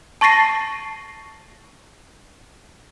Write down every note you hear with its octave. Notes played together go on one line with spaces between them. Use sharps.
A5 C#6 A6 A#6 C7 D#7